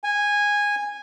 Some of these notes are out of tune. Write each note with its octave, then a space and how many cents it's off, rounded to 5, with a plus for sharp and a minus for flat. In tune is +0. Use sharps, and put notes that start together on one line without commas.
G#5 -10